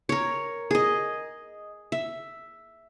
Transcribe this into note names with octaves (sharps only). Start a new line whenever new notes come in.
A#4 C#5
G#4 D#5
E5